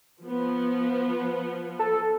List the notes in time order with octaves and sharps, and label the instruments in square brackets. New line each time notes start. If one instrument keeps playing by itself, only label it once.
[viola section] F3 B3
[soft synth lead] A4